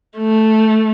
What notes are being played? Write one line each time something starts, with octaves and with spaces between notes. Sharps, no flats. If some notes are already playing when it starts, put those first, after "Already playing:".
A3